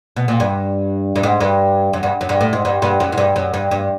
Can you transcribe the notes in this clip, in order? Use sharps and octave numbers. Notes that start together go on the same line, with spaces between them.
B2
A#2
G2
G2
G#2
G2
F#2
G2
F#2
G2
A2
G#2
G2
G2
F#2
G#2
G2
F#2
G2
G2